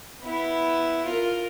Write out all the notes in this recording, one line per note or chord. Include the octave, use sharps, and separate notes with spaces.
B3 E4
F4 A#4